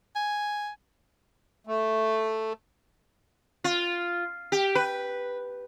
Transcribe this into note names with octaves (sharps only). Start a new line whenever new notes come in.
G#5
A3
F4
G4
B4